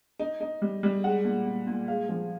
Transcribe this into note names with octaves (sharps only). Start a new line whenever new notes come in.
D#4
D#4
G3
G3
G#3 F#5
A#2
A#2
A#2
G#3 F5
F3